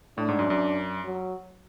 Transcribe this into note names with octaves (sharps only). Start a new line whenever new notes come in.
A2 D4
G#2
F#2
F#2
F#3